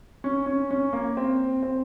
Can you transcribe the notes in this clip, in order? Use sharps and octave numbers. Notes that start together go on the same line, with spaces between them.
C#4
C#4
C#4
A#3
C4
C4